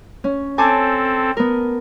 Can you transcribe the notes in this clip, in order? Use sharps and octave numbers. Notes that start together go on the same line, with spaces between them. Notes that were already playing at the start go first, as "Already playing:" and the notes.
C#4
C4 A4 G#5 A5 D6
B3 A#4